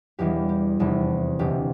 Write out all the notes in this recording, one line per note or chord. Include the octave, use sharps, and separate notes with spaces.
E1 E2 E3 G3 G4
G4
F1 E2 C3 A4
E1 D2 C3 G4